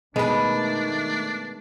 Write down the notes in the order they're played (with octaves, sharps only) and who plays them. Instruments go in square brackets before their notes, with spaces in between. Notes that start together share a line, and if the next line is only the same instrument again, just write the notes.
[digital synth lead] B2 [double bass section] D#3 A3 [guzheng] G#3 B4 [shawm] D4